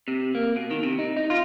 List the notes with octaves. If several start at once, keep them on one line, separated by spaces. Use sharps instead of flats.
C3
A#3
B2
D#3
C3
D#4
D#4
F4